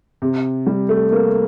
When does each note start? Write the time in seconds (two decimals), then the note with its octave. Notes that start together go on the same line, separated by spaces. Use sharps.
0.22 C3
0.66 G3
0.89 A3
1.12 A#3